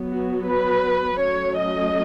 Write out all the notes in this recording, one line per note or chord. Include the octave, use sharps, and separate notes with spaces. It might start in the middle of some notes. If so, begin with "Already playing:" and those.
Already playing: F#3 B3
F#4
B4
F#3 A3 C#4 C#5
D#5